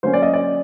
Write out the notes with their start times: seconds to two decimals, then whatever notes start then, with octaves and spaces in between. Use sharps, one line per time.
0.03 D3 F#3 A#3 C#4 C5
0.13 D5
0.22 D#5
0.33 D5